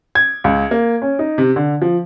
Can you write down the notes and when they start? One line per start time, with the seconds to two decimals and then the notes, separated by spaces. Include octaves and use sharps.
0.15 G#6
0.44 C#2
0.71 A#3
1.02 C#4
1.19 D#4
1.38 C3
1.56 D3
1.82 F3